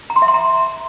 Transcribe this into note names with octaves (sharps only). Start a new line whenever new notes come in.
A#5
C6
E5
C6
A#5